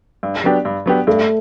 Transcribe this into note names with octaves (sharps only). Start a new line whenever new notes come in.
G2
F#3 B3 D4 G4
G2
F#3 B3 D4 G4
G2 A3